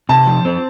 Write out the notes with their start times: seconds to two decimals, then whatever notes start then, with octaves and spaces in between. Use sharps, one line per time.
0.09 C3 A5
0.27 F3
0.45 C4